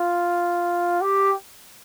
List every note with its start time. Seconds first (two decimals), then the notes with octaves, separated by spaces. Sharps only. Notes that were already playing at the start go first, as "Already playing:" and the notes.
Already playing: F4
1.02 G4